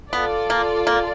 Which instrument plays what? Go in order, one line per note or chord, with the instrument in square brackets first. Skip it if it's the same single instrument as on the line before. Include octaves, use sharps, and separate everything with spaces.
[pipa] B3 [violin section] F4 A4 D5
[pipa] A#3
A#3